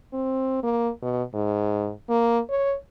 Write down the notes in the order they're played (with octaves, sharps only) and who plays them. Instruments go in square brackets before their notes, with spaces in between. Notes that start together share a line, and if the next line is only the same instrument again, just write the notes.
[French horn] C4
A#3
B2
G#2
A#3
C#5